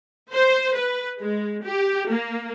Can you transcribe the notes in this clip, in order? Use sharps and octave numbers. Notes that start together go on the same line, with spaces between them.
C5
B4
G#3
G4
A#3